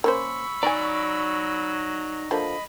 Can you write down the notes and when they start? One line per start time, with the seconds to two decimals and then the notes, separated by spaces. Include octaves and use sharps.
0.04 A#3 C#4 C5 B5 C#6 E6
0.63 F#3 D#4 D5 G#5 A#5
2.31 D3 F3 A#3 D#5 B5